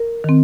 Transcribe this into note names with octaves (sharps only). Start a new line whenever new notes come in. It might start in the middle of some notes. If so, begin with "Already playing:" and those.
Already playing: A#4
D#3 C4